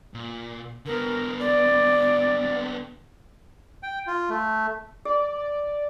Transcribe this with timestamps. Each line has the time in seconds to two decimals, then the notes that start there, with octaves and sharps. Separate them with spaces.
0.14 A#2
0.86 D3 B3 A#4
1.40 D5
3.83 G5
4.07 F4
4.30 A3
5.05 G#4 D5